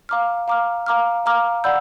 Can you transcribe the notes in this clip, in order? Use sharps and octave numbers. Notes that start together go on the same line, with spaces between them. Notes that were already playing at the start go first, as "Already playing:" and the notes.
F5 A#5 D6 F6
F5 A#5 D6 F6
F5 A#5 D6 F6
F5 A#5 D6 F6
D5 F#5 B5 E6 G6